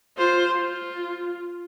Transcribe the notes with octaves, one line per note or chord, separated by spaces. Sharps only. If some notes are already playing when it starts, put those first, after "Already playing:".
F4 C5
F4